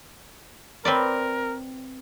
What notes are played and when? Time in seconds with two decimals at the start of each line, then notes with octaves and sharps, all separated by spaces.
0.85 C4 A#4 B4 D5